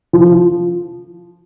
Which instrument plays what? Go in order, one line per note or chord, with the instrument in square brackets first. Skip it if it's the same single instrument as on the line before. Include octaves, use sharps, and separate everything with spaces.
[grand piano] F3